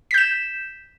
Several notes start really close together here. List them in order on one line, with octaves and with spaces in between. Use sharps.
B6 G6 E7